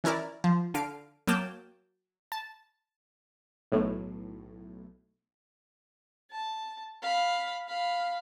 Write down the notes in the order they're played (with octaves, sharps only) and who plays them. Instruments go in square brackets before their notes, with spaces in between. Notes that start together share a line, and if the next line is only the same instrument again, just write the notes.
[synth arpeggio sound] E3 C#4 E4 A#4 D5
F3
D3 F5 D7
F#3 A#3 G5 A5 D6
A5
[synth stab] B1 A2
[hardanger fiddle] A5
F5 B5
F5 B5